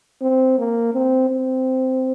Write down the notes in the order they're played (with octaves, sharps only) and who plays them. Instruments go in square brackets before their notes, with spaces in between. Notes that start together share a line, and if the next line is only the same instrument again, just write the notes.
[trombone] C4
A#3
C4
C4